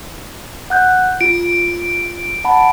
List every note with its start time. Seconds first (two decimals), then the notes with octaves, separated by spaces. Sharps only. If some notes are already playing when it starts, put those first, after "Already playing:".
0.70 F#5 F#6 G6
1.21 F4 D7
2.45 F#5 A5 B5